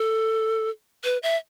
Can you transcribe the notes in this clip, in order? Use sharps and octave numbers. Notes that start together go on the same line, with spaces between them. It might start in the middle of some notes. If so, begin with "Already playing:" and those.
Already playing: A4
B4
E5